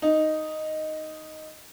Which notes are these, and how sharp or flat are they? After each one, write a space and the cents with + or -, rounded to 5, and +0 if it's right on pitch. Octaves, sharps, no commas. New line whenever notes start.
D#4 +0